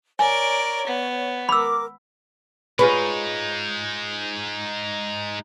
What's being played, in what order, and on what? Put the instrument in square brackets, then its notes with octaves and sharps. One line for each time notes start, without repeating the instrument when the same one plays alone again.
[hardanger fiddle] A#4 D5 [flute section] C#5 [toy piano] G#5
[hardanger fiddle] B3
[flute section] A#4 D6 [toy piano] B5 E6
[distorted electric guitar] G#3 D#4 [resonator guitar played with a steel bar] F4 G#4 C#5 [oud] B4